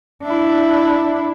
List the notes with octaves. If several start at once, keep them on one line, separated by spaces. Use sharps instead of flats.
D4 E4